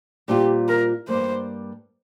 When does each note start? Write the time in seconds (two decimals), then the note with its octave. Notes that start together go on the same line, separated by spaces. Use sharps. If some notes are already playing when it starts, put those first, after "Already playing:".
0.28 A#2 G3 C4 F4 G4
0.68 A#4
1.08 G2 G3 A#3 C5